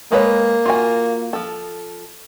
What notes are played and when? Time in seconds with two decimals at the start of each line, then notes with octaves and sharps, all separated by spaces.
0.12 G#3 A#3 B4 C#5
0.66 F4 F#4 G#5
1.33 F3 A4